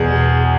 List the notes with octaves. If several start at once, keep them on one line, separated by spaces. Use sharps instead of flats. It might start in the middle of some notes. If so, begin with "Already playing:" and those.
Already playing: E2 B2 G#4